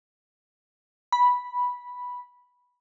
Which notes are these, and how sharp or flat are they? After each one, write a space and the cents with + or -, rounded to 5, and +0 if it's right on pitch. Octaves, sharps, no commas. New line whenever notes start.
B5 -5